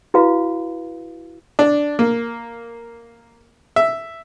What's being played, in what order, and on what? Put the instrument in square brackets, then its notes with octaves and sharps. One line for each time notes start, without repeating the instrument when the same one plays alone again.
[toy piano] E4 F#4 B4 F5
[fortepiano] D4
A#3
E5